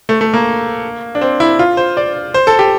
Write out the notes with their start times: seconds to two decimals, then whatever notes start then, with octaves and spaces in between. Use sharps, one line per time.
0.09 A3
0.21 A3
0.34 A#3
1.15 D4
1.21 C4
1.40 E4
1.59 F4
1.77 C5
1.97 D5
2.34 C5
2.47 A4
2.59 G4